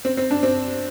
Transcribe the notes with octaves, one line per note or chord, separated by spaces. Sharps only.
C4
C4
D4
C4